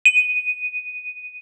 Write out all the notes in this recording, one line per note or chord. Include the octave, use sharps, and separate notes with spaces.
D#7